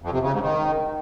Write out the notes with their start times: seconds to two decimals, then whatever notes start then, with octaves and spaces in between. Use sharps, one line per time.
0.02 F2
0.12 C3
0.22 C#3
0.32 G#2
0.42 D#3